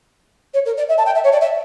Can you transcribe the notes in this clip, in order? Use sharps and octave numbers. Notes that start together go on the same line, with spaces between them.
C#5
A#4
D5
E5
A5
G5
E5
C#5
D5
E5